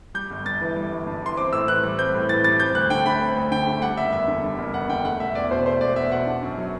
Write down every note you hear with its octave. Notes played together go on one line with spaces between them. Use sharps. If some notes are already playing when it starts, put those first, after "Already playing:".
G3 G6
G1
G2 A6
E3
G3
G1
G2
E3 C6
C4 D6
A2 E6
E3 F#6
G3
C4 G6
A2
E3 A6
G3 A6
C4 G6
D2 F#6
D3 G5
A3 B5
C4
D2
D3 G5
A3
G3 F#5
F#1 E5
E2 E5
D3
G3
F#1
E2 F#5
D3 G5
A3 F#5
E1 E5
E2 D5
B2 C5
A3 C5
E1 D5
E2 E5
B2 F#5
D4
F#2
F#3